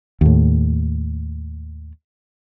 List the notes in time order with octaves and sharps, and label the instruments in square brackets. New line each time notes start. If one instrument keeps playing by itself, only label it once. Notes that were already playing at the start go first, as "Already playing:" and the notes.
[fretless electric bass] D#2 A2